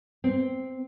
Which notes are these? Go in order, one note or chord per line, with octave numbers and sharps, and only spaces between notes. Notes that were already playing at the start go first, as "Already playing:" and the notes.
C4